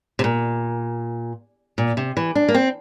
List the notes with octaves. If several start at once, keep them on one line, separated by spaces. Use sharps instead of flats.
C3
A#2
A#2
C3
E3
D4
A#3
C4